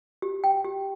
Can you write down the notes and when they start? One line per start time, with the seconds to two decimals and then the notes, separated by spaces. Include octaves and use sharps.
0.22 G4
0.44 G5
0.65 G4